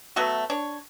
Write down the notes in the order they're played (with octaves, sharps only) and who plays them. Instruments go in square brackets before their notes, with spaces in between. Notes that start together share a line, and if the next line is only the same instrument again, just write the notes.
[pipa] F#3 A3 B3 F#4
D4 C#5